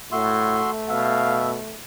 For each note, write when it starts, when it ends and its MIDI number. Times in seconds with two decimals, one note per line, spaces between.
0.12 0.61 45
0.12 1.76 57
0.12 0.71 66
0.12 0.71 76
0.12 0.71 84
0.90 1.60 47
0.90 1.50 76
0.90 1.49 77